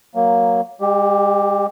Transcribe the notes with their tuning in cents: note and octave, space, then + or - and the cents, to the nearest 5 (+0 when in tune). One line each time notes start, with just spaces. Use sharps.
F#3 +0 A#3 +0
G#3 -45 G4 +0